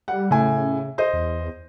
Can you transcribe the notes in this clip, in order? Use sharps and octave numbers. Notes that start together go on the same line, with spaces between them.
G3 F#5
A2 C#3 G#5
C5 D#5
E2